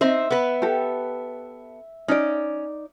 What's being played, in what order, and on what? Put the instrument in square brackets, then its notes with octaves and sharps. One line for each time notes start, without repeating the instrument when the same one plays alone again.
[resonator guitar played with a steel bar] C4 D#4 C5 [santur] E5
[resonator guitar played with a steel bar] B3 B4
[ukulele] G4 A4
[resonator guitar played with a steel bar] C#4 [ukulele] D#4 D5